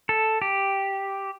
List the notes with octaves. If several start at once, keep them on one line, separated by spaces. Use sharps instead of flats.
A4
G4